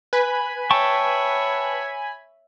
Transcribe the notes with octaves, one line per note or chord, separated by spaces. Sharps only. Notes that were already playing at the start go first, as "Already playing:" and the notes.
B4 G#5 B5
C#5 E5 G5 A5 C#6